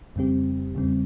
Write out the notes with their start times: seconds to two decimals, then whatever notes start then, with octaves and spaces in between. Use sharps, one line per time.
0.16 F2 C#3 G3 C4 G4
0.75 E2 C#3 G3 C4